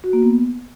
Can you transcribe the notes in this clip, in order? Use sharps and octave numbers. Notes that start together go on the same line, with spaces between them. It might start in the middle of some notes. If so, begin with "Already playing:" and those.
F#4
A#3
B3